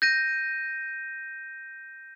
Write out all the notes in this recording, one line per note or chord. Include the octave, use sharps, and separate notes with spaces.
G6 A#6 D#7